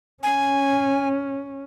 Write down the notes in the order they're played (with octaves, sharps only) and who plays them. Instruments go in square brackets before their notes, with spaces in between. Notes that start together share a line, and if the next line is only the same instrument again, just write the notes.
[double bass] C#4 [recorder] G#5